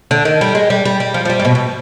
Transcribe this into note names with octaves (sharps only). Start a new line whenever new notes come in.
D3
D#3
G3
G#3
G3
G3
G3
F3
F3
G3
G#2
B2
B2